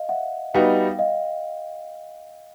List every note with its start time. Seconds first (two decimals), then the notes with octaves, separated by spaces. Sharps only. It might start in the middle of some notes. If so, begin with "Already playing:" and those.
Already playing: D#5 F5
0.09 E5 F#5
0.54 G3 B3 D#4 F#4 F5 G5
0.99 D#5 F5